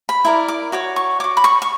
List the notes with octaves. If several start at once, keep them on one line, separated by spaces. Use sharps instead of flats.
B5
E4 A#4 D5
D6
F#4 C#5 D6
C#6
F#4 C#5 D6
B5
C#6
C#6